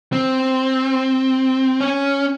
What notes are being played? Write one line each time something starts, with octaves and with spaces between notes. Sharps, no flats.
C4
C#4